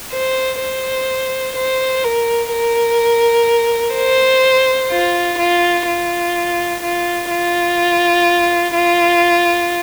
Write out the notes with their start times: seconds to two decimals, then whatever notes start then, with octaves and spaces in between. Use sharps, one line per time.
0.13 C5
0.60 C5
1.56 C5
2.04 A#4
2.51 A#4
3.96 C5
4.91 F4
5.39 F4
5.87 F4
6.83 F4
7.30 F4
8.75 F4